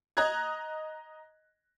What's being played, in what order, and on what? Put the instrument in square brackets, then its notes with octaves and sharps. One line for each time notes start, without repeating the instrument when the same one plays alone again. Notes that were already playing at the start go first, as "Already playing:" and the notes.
[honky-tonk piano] D#5 A#5 D#6 F#6 G#6